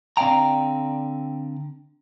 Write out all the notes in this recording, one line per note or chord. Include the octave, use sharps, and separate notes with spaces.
D3 C4 D5 F5 G5 A#5